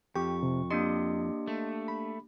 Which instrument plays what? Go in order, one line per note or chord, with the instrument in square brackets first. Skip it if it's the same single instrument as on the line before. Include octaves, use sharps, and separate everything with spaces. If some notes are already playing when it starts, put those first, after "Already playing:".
[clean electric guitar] F2 [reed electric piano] G4 [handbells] C#6
[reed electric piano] C3
[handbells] A#3 D4 G4 [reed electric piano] D#5 C6
[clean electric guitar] A3
[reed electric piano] B5